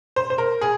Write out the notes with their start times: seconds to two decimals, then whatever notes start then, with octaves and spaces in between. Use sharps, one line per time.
0.16 C5
0.30 C5
0.38 A#4
0.61 G#4